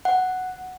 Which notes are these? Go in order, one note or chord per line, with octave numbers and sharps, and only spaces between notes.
F#5